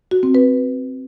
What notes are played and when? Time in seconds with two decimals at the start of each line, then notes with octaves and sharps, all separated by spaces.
0.11 F#4
0.23 C4
0.35 B4